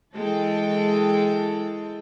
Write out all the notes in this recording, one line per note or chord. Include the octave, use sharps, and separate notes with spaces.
E3 G#3 A4 G5